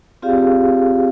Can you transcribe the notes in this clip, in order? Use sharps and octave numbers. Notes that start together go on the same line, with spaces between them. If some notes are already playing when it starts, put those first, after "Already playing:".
C4 F4 G4 G#4 D5 F5